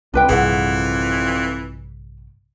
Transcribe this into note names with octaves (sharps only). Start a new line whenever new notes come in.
C2 F2 D4 B4 G5
A#1 G2 C3 E3 G#4 F#5